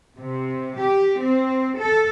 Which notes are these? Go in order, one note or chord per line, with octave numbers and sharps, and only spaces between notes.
C3
G4
C4
A4